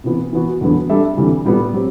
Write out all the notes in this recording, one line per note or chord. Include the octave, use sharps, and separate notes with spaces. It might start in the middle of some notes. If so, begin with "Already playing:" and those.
C3 E3 B3
E3 B3 F#4
E2 D3 F#3 B3
G3 D4 A4 E5
D2 C3 E3 G3
A2 G3 B3
F#3 C4 G4